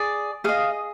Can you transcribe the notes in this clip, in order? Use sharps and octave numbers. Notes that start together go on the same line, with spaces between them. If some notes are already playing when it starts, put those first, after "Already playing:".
Already playing: G#4 D5
G#4 D#5 F5